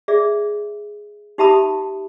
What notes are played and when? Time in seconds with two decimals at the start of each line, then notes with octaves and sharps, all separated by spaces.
0.08 G#4 D5 E5
1.38 D#4 G4 E5 A5 B5 D#6